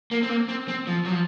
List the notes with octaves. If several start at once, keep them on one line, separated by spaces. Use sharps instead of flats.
A#3
C4
A#3
C4
C4
F3
F#3
F3